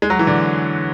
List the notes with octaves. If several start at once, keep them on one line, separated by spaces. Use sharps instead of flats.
G#3
F#3
E3
D3